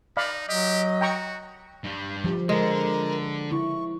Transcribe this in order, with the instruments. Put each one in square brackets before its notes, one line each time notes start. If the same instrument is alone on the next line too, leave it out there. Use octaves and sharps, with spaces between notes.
[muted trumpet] D#4 [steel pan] D5 F5 B5
[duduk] F#3 [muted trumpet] G4 [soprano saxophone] D#5
[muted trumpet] F#4 [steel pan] G5 A#5 C#6
[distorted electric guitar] G2 G3
[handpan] F3 [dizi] G4
[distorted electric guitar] D3 [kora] G#3 [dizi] A#4
[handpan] E4 [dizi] C#6